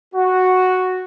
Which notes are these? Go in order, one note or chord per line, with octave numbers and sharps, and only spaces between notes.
F#4